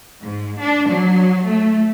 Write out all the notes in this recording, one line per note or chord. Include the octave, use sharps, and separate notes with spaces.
G#2
D4
F#3
A3